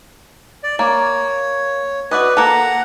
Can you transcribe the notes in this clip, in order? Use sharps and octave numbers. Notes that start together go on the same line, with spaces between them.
D5
A#3 C#5
F#4 B4 D5 D#5
A#3 A4 F#5 A#5